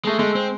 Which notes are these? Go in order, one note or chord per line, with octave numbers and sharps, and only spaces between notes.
G#3 A3
G#3 A3
C4